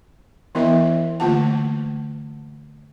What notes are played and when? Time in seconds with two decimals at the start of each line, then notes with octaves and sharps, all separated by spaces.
0.55 E3 B3 E4 A#4 D#5 E5
1.20 D3 A3 A#3 F4 F#5 A5